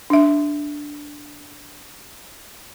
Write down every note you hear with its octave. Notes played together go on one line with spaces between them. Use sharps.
D4 E5